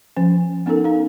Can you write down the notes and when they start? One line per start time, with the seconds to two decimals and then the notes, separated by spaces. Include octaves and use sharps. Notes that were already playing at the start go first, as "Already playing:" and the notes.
0.17 F3 C#4
0.66 B3 C#4 D#4 A4 A#4
0.84 D#4 F5